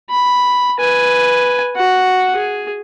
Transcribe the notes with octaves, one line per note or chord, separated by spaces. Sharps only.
B5
B4 G#5
F#4 F#5
G#4